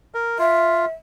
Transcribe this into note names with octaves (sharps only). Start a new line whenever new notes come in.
A#4
F4 E5